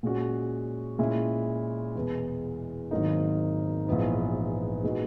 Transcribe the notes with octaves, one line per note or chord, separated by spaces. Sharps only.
A#2 G#3 C#4 F#4
A#2 G#3 C#4 E4
E2 B2 G#3 B3
G#1 G#2 F#3 A#3 D#4
A#1 G#2 E3 B3 D#4
A#2 G#3 B3 D#4 F#4